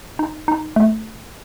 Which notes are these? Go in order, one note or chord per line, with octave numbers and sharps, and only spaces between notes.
D#4
D#4
A3